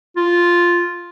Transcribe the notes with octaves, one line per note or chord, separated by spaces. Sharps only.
F4